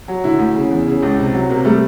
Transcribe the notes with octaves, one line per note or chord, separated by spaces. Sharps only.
F#3
D3 E4
D2
C#3
E2
C#3
C#2
C3
F#3
C3 A#3
G3 A3